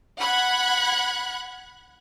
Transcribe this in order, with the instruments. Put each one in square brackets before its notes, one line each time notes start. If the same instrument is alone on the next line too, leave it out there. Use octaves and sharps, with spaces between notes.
[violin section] F#5 B5 F#6 G#6